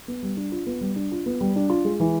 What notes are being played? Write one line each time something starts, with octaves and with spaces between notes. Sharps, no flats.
B3
G3
D4
F4
B3
G3
D4
F4
B3
G3
D4
F4
G#3
E3